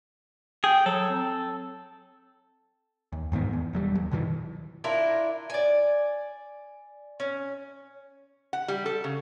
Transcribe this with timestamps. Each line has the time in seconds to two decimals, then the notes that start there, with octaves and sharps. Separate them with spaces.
0.64 G#4 G5
0.86 F#3 A4
1.10 C4
3.12 D#2
3.32 F2 G#2 D#3 B3
3.53 E2
3.73 E1 F#3 G3
3.97 D#2
4.11 F#2 B2 D#3 E3
4.84 D4 E4 F4 A#4
5.50 D5 G#5
7.20 C#4
8.53 F#5
8.68 G3
8.86 A4
9.04 C#3